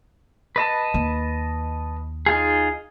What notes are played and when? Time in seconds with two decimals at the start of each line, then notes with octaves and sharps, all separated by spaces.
0.56 B4 D#5 A5
0.94 D#2
2.26 D#4 F4 G#4